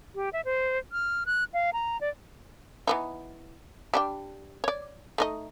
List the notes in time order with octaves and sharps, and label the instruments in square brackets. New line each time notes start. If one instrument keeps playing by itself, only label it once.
[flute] G4
E5
C5
F6
F#6
F5
A#5
D5
[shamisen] E3 B3 D#4
G3 D4 G5
C#5 D5
A3 D#4 D#5